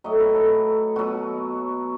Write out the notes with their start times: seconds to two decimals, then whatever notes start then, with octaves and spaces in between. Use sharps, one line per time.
0.04 A2 F#3 D#5
0.20 B4
0.35 A4
0.96 B2 F#3 F#4